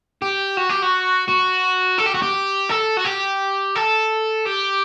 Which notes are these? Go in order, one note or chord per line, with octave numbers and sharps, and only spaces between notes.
G4
F#4
G4
F#4
F#4
A4
G4
F#4
G4
A4
F#4
G4
A4
G4